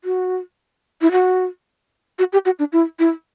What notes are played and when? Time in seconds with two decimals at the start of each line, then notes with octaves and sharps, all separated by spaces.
0.04 F#4
1.01 E4
1.12 F#4
2.19 F#4
2.33 G4
2.45 F#4
2.59 D4
2.72 E4
2.99 E4